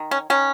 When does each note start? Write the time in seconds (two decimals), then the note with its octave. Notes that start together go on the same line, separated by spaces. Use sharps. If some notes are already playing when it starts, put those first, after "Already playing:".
Already playing: D#3
0.11 C#4
0.30 D#3 C#4